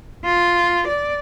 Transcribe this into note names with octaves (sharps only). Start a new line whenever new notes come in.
F4
D5